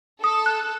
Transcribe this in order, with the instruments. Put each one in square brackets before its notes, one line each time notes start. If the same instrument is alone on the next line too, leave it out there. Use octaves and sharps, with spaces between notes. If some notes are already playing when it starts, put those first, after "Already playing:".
[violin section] A4 [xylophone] D#6
[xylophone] F#6